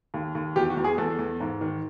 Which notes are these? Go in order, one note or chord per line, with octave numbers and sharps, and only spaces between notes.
D#2
D#2
E2 G4
F#4
E2
G#4
E2 A4
E2
G#2
D#3